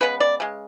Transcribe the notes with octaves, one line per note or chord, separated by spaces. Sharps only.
C#3 G#3 B3 B4
D5
C#3 G#3